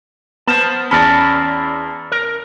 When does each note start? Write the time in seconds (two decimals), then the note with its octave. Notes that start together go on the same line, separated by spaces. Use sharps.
0.47 B3 C5 A5 F6
0.91 E2 C#4 D5 A5 B5 F6 A#6
2.12 A#4